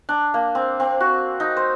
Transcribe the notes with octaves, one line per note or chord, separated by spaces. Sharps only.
D4
A#3
C4
C4
F#4
D#4
C5